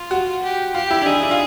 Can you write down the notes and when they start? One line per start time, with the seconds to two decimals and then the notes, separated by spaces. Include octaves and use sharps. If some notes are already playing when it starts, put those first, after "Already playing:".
Already playing: F4
0.11 F#4
0.43 G4
0.75 F4 G4
0.91 E4
1.02 D4
1.06 D#4 G#4
1.22 D4
1.31 F4